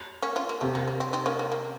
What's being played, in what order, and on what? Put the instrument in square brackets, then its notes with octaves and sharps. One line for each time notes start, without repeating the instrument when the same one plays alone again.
[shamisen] A#3 C#4
C#4 F4
A#3
[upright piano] C3 [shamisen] A3
[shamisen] A#3
A#3
C4
C4 D#4
A#3 C#4
A#3
A#3